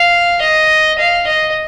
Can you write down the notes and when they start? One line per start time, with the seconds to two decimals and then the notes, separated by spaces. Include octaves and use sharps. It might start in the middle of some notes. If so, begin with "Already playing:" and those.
Already playing: F5
0.42 D#5
0.99 F5
1.27 D#5